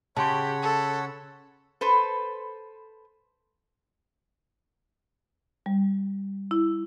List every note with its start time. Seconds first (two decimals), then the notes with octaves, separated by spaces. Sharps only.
0.17 C#3 G4 C#5 F#5 A5 B5 C6
0.62 A4
1.81 A4 B4 C5
5.66 G3
6.51 E4